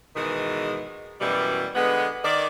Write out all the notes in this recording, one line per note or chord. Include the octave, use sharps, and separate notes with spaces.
G#2 B2 D#3 E3 G#3
F#2 B2 E3 G3
D3 G#3 B3
D#3 D5